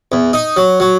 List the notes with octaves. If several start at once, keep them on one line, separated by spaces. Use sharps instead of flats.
E2
D#4
F#3
F#3